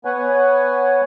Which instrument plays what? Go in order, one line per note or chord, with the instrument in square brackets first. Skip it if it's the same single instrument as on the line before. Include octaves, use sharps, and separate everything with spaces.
[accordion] B3 B4 C#5 F#5 G#5